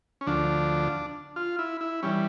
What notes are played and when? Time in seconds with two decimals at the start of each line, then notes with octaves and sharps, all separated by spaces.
0.21 C#4
0.27 D2 D3 F3 D4
1.36 F4
1.59 E4
1.81 E4
2.03 E3 G3 C#4